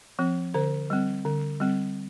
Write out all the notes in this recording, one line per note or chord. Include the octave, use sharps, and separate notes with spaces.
F3 C4
D3 C5
G3 C4
D3
G3 C4